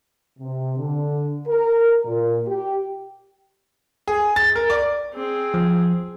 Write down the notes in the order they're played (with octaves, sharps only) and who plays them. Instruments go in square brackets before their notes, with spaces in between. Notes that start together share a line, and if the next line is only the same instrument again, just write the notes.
[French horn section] C3
D3
A#4
A#2
G4
[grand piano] G#4
A6
A#4
D5
[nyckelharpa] C4 G#4
[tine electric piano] F3